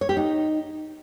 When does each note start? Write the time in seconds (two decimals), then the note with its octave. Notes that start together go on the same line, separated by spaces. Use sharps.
0.01 C#5
0.09 G4
0.17 D#4